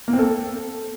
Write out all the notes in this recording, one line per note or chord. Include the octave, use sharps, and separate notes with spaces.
A#3
C4
A4